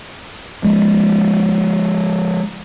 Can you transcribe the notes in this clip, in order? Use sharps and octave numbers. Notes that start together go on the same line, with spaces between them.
F3 G#3